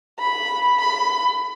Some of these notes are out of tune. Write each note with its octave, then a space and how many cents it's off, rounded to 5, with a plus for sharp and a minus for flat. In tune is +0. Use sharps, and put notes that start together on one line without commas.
B5 -5
B5 +25